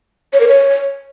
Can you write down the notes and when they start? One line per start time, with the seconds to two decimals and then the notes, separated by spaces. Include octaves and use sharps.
0.33 C#5
0.40 A#4
0.48 C#5